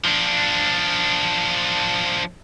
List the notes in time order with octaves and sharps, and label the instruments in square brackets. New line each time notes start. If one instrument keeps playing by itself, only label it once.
[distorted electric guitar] F3 D4